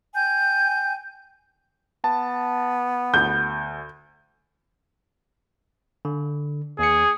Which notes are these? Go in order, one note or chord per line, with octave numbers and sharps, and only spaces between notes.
G5 G#5 G6
B3 A5
D2 G6
D3
D#2 G#4 C#7